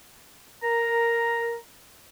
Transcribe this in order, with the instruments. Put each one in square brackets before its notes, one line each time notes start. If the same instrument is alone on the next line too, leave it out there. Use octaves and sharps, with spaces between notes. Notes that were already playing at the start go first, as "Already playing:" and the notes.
[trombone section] A#4 [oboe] A#5